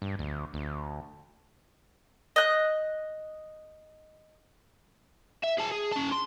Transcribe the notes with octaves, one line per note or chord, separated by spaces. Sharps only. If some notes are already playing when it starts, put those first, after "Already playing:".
G2
D2
D2
D#5 F#6
E5
G#4 A5
G#4
C#4 A5
C6